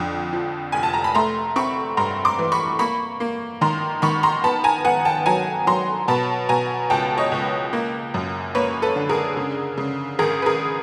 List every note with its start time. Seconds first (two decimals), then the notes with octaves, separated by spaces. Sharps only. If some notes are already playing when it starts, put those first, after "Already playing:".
Already playing: F2 D3
0.33 F3
0.72 F1 G#5
0.83 A5
0.94 A#5
1.04 B5
1.15 A3 A#5 C6
1.56 C4 B5 C#6
1.97 G2 A#5 C6
2.25 C6 D6
2.39 E3
2.52 B5 C#6
2.79 A#3 B5 C#6
3.20 A#3
3.61 D#3 A#5 C6
4.02 D#3 B5 C#6
4.23 A#5 C6
4.44 B3 A5 B5
4.64 G#5 A#5
4.85 B3 F#5 G#5
5.05 G5 A5
5.26 F#3 G#5 A#5
5.67 F#3 A#5 C6
6.08 B2 A5 B5
6.49 B2 G#5 A#5
6.90 C#2 G5 A5
7.18 C#5 D#5
7.32 C#2
7.73 A#3
8.14 F#2
8.55 A#3 B4 C#5
8.82 A4 B4
8.96 D3
9.09 G#4 A#4
9.37 C#3
9.78 C#3
10.19 G#1 G#4 A#4
10.42 B4
10.46 G#4 A#4